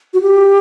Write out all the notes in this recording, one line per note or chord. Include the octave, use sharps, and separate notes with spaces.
F#4
G4